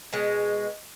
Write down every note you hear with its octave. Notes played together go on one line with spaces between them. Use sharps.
B2 G#3